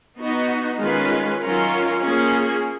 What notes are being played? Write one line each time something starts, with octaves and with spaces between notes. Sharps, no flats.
B3 D#4 F#4
D#3 G#3 C#4 F4 B4
D#3 F#3 C#4 F4 A#4
A#3 C#4 F4 G#4